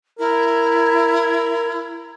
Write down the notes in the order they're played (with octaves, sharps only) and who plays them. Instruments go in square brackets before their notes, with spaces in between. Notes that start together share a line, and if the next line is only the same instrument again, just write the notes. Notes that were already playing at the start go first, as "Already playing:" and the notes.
[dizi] E4 [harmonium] A#4